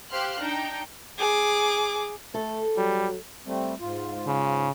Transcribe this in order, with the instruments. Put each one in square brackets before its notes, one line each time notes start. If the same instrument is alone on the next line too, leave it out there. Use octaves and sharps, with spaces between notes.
[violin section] G4 C5 F5 C6 F6 F#6
D4 D#4 G5 A#5
[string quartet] G#4 D6
[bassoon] A3 [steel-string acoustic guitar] A4
[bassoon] F#3 [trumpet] G3
[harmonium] G3 A3 C4
G#2 F4
[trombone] C#3